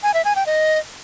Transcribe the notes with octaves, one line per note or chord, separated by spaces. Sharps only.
G#5
E5
G#5
G5
D#5